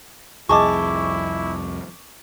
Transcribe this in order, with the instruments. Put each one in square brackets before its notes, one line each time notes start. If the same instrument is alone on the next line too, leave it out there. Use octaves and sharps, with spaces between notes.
[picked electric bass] C2 F2 [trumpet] E4 [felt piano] G#4 D#5 A5 [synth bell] C#6 D6